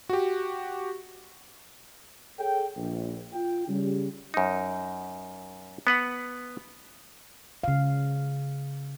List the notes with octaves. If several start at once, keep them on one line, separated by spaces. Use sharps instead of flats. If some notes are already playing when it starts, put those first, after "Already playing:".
F#4 G4
G#4 A4 C#5 G5
A#1
F4 G5
C#3 G3
F#2 D#4
B3 B4 F#5
C#3 F5